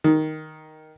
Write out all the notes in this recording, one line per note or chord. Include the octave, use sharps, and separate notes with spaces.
D#3